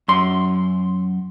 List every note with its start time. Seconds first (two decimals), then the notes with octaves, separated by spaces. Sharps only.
0.08 F#2 C6